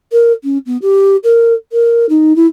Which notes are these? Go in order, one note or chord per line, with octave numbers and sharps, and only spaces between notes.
A#4
C#4
B3
G4
A#4
A#4
D#4
E4